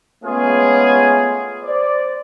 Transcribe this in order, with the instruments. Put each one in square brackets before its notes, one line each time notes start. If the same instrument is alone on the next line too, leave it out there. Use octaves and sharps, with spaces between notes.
[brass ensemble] G#3 A3 B3 C#4 F4 G#4
C5 D5